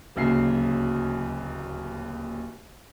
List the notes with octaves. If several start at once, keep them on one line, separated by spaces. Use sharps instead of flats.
D1 D#2 C#3 F#3 C7